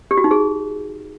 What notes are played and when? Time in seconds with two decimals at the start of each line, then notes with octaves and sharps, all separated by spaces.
0.11 G4
0.17 F#4
0.24 D#4
0.31 G#4